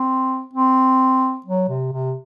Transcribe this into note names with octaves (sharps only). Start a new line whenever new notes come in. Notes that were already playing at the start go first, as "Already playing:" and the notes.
Already playing: C4
C4
F#3
C3
C3